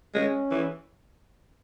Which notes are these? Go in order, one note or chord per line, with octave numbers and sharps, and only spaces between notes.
G#3 C#4
E3